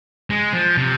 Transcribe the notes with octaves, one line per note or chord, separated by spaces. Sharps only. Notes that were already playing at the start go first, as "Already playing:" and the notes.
G#3
F3
C3